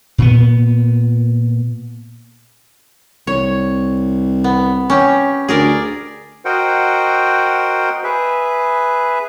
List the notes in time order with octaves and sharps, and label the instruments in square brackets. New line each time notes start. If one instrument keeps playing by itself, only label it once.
[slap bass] A#2 B3
[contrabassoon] C2 [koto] C#5
[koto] B3
C#4 G4
[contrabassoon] D2 [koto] G#4 A#4 D5
[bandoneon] F#4 A#4 C5 D#5 F#5 G5
G#4 B4 E5